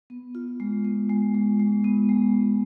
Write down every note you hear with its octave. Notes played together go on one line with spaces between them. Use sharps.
B3
F4
G#3
B3
G#3
G#3
G#3
B3
G#3
G#3